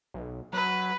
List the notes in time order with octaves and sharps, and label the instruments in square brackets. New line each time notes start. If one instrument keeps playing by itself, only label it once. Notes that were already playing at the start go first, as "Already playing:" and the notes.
[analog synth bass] B1
[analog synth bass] F#3 [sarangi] B4